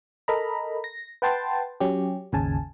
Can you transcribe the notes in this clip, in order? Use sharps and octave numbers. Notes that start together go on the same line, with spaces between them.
A4 A#4 D#5 A#5 B5
A#6
B4 F#5 G5 A5 C6 A6
F#3 C#4 G4
G#1 D#2 C#3 G#5 A5